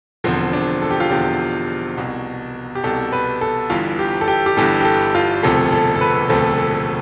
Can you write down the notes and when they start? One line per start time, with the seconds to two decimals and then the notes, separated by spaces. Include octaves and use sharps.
0.24 E1 E2 D3 F3 C4
0.53 D4
0.82 A4
0.91 G4
1.00 F4
1.10 E1 E2 D3 F3 G4
1.98 C2 B2
2.75 G4
2.84 C2 B2 A4
3.12 B4
3.41 A4
3.70 G1 G2 E3 F4
3.99 G4
4.21 A4
4.28 G4
4.46 G4
4.57 G1 G2 E3 A4
4.81 G4
4.85 A4
5.15 F4
5.43 E1 D2 C3 F3 A4
5.72 A4
5.96 A4
6.01 B4
6.29 E1 D2 C3 F3 A4
6.58 A4